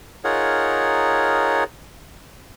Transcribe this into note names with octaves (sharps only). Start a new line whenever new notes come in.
D#4 F4 G#4 A#4 C#5 F#5